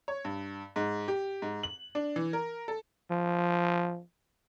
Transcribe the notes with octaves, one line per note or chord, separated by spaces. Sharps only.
C#5
G2
G#2
G4
G#2
F#7
D4
E3
A#4
A4
F3